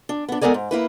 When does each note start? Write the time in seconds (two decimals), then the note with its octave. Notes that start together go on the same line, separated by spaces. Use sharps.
0.09 D4
0.28 B3 D4
0.41 G#3 B3 A4 A#4 D5 G#5
0.54 G#2
0.71 A#3 E4 B4